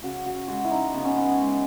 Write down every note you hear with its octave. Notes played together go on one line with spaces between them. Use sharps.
C#3 F#4
F#4
G#3 F#4
E4
D#4
C#3 B3
C#4
B3
G#3